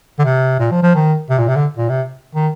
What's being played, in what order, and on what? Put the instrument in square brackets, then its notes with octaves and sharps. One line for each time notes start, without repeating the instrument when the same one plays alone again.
[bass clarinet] D3
C3
A#2
F3
F3
D#3
C3
A#2
C3
D3
A#2
C3
D#3